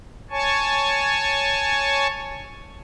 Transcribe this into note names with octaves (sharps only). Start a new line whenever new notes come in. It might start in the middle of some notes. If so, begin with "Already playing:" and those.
C#5 G#5 A5 C#6